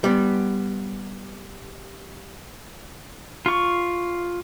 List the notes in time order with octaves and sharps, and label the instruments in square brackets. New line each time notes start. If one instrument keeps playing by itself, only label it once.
[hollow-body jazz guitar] G3 B3
[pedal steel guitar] F4 C#6